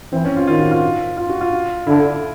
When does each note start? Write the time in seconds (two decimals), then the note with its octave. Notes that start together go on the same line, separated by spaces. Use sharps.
0.13 E3 C4
0.25 C#4
0.36 F4
0.47 D#3 F4
0.59 F#4
0.71 F4
1.17 F4
1.30 F#4
1.41 F4
1.87 D3 E4